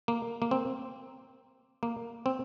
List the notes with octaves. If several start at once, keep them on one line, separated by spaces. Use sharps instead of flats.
A#3
A#3
C4
A#3
C4